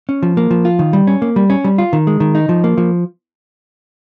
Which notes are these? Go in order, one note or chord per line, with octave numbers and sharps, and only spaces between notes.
C#4
F3
A#3
F3
F4
D#3
G3
C#4
A#3
G3
C#4
G3
F4
D#3
G#3
D#3
D#4
F3
A#3
F3